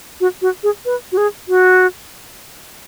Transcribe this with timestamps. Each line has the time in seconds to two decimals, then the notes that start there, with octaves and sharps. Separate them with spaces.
0.20 F#4
0.42 F#4
0.63 G#4
0.86 B4
1.12 F#4
1.17 G#4
1.48 F#4